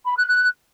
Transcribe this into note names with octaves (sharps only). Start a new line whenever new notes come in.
B5
F#6
F#6